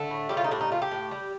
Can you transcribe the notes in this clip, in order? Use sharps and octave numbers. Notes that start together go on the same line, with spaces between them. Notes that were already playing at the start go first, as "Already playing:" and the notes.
Already playing: D3 A3
A2
G3 G4
F4
D#4
A2 D4
D#4
A3 F4
G4
A2
G3